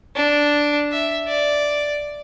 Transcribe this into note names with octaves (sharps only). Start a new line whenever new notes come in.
D4
E5
D5